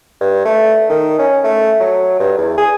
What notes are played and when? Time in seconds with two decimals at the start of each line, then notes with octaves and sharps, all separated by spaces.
0.21 G2
0.45 A3
0.90 D#3
1.19 C#4
1.44 A3
1.80 F#3
2.20 G2
2.38 E2
2.58 G#4